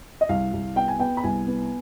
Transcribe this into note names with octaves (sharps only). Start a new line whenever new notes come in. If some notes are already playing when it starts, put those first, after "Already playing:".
D#5
C2 F5
C2
B3 G5
G#5
B3 G5
B5
C2 G#5
B3